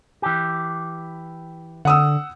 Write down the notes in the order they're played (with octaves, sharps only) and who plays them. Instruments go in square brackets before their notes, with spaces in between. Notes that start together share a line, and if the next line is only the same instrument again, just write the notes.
[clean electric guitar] E3 G4
[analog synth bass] D3 [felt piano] F#5 D#6 E6